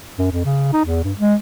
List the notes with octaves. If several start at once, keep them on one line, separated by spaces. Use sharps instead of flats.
F#2
F2
C#3
D#4
E2
G2
G#3